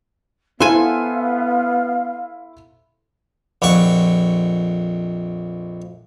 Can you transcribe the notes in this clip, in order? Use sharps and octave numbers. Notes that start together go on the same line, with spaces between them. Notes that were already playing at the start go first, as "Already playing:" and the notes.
B3 E4 A4 C5 F5 G#5 C6
A#1 F2 F#5 C#6